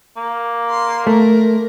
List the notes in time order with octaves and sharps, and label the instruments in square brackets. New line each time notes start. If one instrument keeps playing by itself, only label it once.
[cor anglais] A#3
[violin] C6
[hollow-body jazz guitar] A3 [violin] A#4